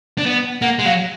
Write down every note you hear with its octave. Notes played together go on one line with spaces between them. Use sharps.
D4
B3
A#3 F#5
G#3
F#3 F5